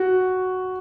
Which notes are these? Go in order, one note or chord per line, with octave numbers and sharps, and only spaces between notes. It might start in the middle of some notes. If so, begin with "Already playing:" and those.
Already playing: F#4